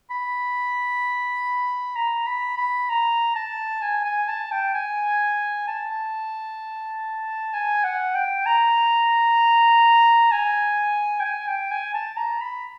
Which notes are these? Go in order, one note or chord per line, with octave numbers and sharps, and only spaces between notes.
B5
A#5
B5
B5
A#5
A5
G#5
G#5
A5
G5
G#5
A5
G#5
F#5
G5
A#5
G#5
G5
G#5
G5
G#5
A5
A#5
B5